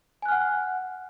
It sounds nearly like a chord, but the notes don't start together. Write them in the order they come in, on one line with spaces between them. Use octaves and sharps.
G#5 F#6 F6 F#5